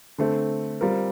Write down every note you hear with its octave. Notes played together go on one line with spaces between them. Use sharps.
D3 A3 C4
G3 C4 F4 A#4